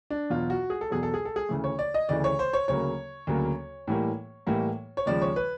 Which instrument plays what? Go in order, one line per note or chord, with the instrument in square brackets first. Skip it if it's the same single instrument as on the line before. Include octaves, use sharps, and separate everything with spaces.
[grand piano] D4
E2 B2 F#3 F4
F#4
G#4
A4
E2 B2 F#3 G#4
A4
G#4
A4
G#4
D2 C#3 E3 A3
C#5
D5
D#5
D2 C#3 E3 A3 D5
C#5
C5
C#5
D2 C#3 F#3 A#3 C#5
D2 C#3 F#3 A#3
A2 E3 G3 A#3
A2 E3 G3 A#3
C#5
D#2 C#3 F3 G#3 D5
C#5
B4